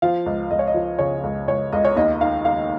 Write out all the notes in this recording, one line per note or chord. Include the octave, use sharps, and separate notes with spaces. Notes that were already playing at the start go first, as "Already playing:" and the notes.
F3 F5
C#2
C#2 D#5
C#5
D#5
F3
C#3 C#5
C#2
C#2 C#5
C#2 D#5
C#5
D#2 D#5
D#3 F5
D#3 F5